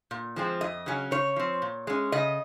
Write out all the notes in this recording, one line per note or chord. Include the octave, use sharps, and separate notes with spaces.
A#2
F3 G#3 C4
F2 D#5
C#3 F#3 C#4
C#3 C#5
F3 C4
A#2
G#3 C#4
C#3 D#5